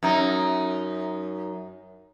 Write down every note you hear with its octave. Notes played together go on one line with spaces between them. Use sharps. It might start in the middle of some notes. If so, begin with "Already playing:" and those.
F#2 D#4